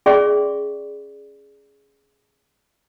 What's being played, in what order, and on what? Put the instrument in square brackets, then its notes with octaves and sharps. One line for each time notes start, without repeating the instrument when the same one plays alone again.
[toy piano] C#4 G#4 D5 E5 C6 C#6